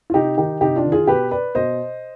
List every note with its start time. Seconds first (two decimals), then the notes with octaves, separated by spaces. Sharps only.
0.10 F4
0.14 C3 D#4 G4
0.37 D#3 D#4 G4
0.61 C3 D#4 G4
0.76 D4 F4
0.84 D#3
0.92 F4 G#4
1.07 B2 G4 B4
1.31 B4 D5
1.55 B2 C5 D#5